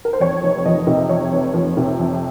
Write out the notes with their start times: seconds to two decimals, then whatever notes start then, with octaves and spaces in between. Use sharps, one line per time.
0.05 A#4
0.13 C5
0.20 F2 C#5
0.43 F1
0.66 F3 D#5
0.87 C3
1.09 F2 C#5
1.32 F1
1.54 F3
1.77 C3
1.99 F2